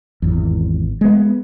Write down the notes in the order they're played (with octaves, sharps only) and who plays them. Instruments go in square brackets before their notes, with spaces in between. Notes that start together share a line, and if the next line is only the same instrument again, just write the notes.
[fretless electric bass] G#1 E2
G#3 B3